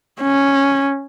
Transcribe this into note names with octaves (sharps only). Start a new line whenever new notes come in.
C#4